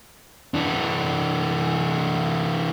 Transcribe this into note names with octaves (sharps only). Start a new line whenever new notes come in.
E3 D4